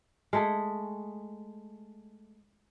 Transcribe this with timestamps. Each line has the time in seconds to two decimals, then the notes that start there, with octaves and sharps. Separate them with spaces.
0.33 G#3 A3 G#4